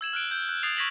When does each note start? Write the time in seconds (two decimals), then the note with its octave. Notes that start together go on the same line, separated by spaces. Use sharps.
0.01 E6 G#6 E7 F#7
0.13 F6 F#6 D7
0.31 G6
0.49 F#6
0.63 D#6 G#6 A6 C7 F7
0.77 C#6 G#6 A#6 B6 E7 F#7